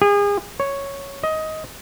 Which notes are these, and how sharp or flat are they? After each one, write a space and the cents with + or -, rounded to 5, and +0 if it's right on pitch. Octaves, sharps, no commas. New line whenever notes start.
G#4 -35
C#5 +0
D#5 +15